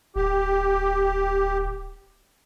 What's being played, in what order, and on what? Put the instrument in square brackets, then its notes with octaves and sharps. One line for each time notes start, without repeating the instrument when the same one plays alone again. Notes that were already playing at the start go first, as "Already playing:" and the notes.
[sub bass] D1 [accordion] G4